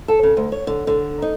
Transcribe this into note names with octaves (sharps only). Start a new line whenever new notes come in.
A4
C#3
D2
C#5
D3
D3
D#4